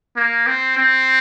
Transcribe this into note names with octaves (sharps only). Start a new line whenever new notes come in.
A#3
C4
C4